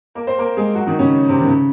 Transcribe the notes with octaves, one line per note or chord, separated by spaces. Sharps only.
A#3 A#4
C4 C5
A#3 A#4
G#3 G#4
F#3 F#4
D#3 D#4
C#3 C#4
C3 C4
D#3
C#3